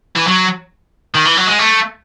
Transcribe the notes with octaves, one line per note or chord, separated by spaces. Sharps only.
E3
F#3
D#3
E3
F#3
G#3
A3